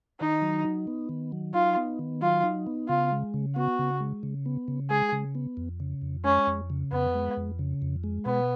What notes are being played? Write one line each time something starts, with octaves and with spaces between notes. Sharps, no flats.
D#3 D#4
F#3
D#4
B3
D#3
F#3
D#4 F4
B3
D#3
F#3 F4
D#4
B3
C#3 F4
G#3
C#3
B3 F#4
C#3
G#3
C#3
B3
C#3
G#3 G#4
C#3
B3
F2
C#3
F2
G#3 C#4
F2
C#3
F2 B3
G#3
F2
C#3
F2
G#3
B2 B3